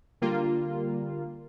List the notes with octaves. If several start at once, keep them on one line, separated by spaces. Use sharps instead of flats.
D3 G3 A#3 F4